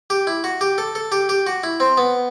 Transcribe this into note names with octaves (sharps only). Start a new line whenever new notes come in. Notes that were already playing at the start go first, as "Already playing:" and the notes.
G4
E4
F#4
G4
A4
A4
G4
G4
F#4
E4
C4
B3